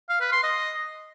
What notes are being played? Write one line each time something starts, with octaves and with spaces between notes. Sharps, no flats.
F5
B4
C6
D#5